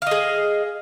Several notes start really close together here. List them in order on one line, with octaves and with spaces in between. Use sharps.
F5 D#5 G#4